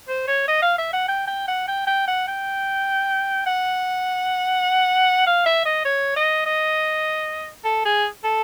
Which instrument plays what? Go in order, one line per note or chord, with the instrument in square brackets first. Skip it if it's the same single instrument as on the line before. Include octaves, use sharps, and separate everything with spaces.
[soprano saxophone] C5
C#5
D#5
F5
E5
F#5
G5
G5
F#5
G5
G5
F#5
G5
F#5
F5
E5
D#5
C#5
D#5
D#5
A4
G#4
A4